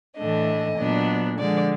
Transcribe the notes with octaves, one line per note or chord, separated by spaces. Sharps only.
A2 E3 A3 D4 D#5
A#2 F#3 B3 D4
D3 F3 G#3 D5